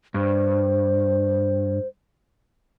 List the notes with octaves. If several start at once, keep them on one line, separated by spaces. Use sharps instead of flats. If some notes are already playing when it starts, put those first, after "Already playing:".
G2 C5